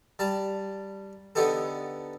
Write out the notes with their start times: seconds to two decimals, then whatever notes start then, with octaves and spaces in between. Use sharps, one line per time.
0.19 G3 A5 A#5
1.35 D3 B3 D#4 G4 A4